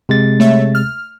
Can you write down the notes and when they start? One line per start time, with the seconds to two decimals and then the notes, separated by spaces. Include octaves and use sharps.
0.09 C3 G#3 A6
0.40 A3 C#5 E5
0.75 F6